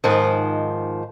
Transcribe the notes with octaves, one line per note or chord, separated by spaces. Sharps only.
G#2 D#3 F3